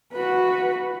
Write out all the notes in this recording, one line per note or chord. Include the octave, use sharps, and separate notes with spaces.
F#4 B4